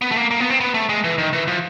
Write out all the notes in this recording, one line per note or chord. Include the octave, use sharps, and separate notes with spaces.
B3
A3
A#3
A#3
B3
C4
B3
A3
G#3
E3
D#3
E3
F3